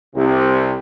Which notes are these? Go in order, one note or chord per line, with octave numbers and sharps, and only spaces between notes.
C2 C3